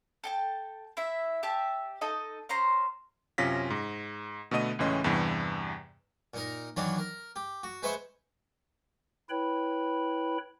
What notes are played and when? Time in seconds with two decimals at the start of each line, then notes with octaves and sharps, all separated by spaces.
0.24 A4 G5 A5
0.97 E4 E5
1.43 G4 E5 A5
2.01 D#4 A4 D#5
2.49 C#4 C5 A#5 C6
3.38 F#2 C3 C#4 F4 A#6 B6
3.70 G#2
4.51 B2 D3 A3 B3 D#5 D#7
4.79 C#2 A2 E3 C#4 D#5 C6
5.04 E2 G2 C3 E3
6.34 A#2 D#4 A#4
6.76 D#3 E3 F#3 D4 F#4
6.98 A#4
7.36 G4
7.63 F#4
7.83 G#3 B4 C5 E5 F#5 C#6
9.30 E4 B4 C#5 G5 B5